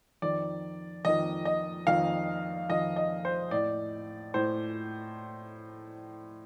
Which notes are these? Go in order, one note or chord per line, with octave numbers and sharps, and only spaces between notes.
F2 D#3 D5
F2 D#3 D#5
D#5
F2 D#3 F5
F2 D#3 D#5
D#5
C5
A2 D5
A2 C5